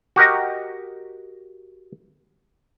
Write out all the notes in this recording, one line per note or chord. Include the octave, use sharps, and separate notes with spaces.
F#4 G4 A#4 D#5